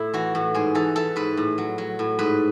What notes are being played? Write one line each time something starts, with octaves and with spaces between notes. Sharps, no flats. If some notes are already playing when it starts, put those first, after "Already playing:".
Already playing: A2 E4
E3 F#4
A2
G#2 G#4
E3 A4
E3 A4
G#2 B4
A2
F#3
F#3
A2
G#2 B4